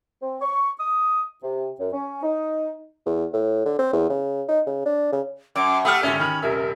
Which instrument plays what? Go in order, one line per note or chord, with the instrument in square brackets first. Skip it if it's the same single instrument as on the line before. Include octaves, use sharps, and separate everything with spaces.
[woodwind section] C4
C#6
D#6
C3
F#2
C#4
D#4
[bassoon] E2
A2
D3
C4
E2
C#3
D#4
C#3
D4
C#3
[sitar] F#2 [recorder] D6
[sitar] A3 G4 A4 [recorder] F#5 [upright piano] B5 D#6 F6
[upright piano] G#1 D3 [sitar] C#4 [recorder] E5
[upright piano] D#3 F6 [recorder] B5
[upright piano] D#1 C3 E5 [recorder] A#4